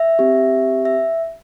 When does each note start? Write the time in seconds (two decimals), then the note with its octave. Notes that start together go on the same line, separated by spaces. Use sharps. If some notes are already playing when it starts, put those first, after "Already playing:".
Already playing: E5
0.19 C4 G4
0.85 E5